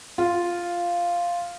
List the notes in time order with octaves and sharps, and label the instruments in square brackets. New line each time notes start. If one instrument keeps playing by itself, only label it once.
[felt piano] F4